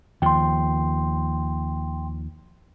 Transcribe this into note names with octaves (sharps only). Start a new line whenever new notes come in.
D#2 F3 G5 C6